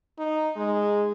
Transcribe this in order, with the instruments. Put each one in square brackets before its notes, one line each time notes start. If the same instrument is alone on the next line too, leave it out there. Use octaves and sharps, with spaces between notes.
[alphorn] D#4
G#3